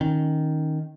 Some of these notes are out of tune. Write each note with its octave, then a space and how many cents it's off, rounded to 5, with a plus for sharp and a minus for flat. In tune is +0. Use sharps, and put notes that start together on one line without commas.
D#3 +0 C#4 -15